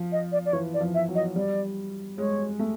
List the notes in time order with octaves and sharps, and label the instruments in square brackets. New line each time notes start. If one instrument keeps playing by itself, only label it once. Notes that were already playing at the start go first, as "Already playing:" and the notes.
Already playing: [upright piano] F3
[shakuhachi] D#5
D5
D5
[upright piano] E3 [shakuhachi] C#5
[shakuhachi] D5
[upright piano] F3
[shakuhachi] E5
[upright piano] F#3
[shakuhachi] D#5
[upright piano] G3 [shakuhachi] D5
[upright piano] G#3 [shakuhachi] C#5
[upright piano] A3